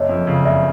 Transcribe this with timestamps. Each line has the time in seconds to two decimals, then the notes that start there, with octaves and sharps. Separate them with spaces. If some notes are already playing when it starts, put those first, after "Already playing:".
Already playing: F#1 C#5 D#5
0.09 F2
0.27 C#3
0.45 F#1 D5 E5